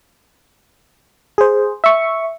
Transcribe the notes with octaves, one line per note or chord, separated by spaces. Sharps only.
G#4 C5
E5 C#6